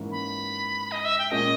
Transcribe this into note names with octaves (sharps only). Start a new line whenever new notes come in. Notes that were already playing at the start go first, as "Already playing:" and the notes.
Already playing: G#2 E3 A#3 C#4 E4
B5
D#5
E5
G5
A#2 G#3 C#4 D#5